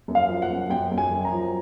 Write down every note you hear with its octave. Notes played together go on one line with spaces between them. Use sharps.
F#2
F5
F3
F#5
F#2
F#2 G5
F#2
G#5
F#2
A#5
F3